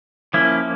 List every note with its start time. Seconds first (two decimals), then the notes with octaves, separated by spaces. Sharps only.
0.34 F3 A#3 C#4 E4